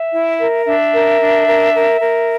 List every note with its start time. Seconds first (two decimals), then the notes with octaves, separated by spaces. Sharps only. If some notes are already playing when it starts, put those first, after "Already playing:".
Already playing: E5
0.12 E4
0.40 A#4
0.66 D4 E5
0.93 A#4
1.20 D4
1.48 A#4
1.75 A#4
2.01 A#4